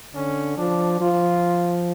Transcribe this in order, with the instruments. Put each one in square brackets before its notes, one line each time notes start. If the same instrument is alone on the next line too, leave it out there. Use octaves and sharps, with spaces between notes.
[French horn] D3 [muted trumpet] C#4
[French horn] F3 [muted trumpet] D4
[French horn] F3 [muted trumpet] F4